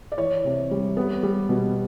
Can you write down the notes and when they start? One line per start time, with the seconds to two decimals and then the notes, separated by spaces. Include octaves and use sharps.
0.12 D5
0.18 E3 C#5
0.45 C3
0.71 G3
0.97 B3
1.23 G3
1.49 B2